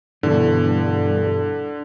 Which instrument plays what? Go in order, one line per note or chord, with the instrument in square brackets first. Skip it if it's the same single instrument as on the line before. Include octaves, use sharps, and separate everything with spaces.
[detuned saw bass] G2 [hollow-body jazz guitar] B2 E3 [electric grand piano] D3